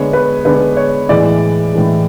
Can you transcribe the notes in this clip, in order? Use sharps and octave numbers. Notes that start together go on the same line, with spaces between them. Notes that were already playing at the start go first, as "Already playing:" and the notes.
Already playing: D3 G#3 B3 C#5
B4
D3 G#3 B3 B4
C#5
A2 E3 G#3 D5
A2 E3 G#3